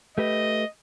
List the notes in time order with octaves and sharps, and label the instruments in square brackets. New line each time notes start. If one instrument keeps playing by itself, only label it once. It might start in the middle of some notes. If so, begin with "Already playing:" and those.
[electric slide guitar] A3 G4 B4 [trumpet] D#5